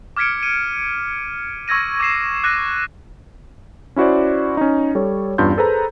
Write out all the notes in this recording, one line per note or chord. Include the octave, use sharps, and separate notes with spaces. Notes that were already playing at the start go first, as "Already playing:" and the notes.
D6 F6 G#6 B6 C#7 D7
D#7
C#6 E6 G#6 A#6 D#7
D6 G#6 C7 E7
D6 F#6 A6 A#6 C7 D#7
C#4 E4 F#4 C5 D5
C#4 D#4
G3 A4 C#5
E2 G2 C#4 F4 C6 G6
G#4 A4 B4 C5 A#5